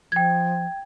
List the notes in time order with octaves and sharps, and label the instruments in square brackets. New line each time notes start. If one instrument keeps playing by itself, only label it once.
[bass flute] F3 [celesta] G5 G#6